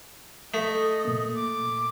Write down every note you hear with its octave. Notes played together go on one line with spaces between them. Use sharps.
A3 D#5
A#2 A#3
D6